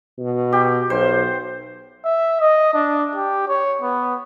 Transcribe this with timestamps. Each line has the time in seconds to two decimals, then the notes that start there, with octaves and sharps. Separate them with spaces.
0.18 B2
0.53 G4
0.90 B1 C5
2.05 E5
2.40 D#5
2.74 D4
3.16 G4
3.49 C#5
3.82 B3